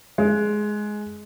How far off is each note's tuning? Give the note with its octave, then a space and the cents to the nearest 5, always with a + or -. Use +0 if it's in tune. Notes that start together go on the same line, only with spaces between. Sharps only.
G#3 +10